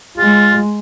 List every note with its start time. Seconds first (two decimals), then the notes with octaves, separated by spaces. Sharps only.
0.18 G#3 F4